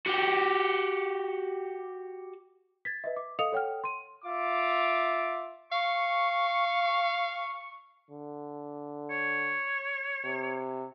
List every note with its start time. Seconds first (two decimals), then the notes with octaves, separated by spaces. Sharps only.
0.06 F#4 G4
2.85 G#6 A6 B6
3.04 B4 D#5 E5
3.16 D6
3.39 A4 D#5 F5 D#6 C#7 F7
3.52 A4 C#5 F#5 G5 F6
3.84 C6 D#7
4.25 F4 E5 D6
5.72 F5 C#6
8.11 D3
9.10 C#5
10.25 C3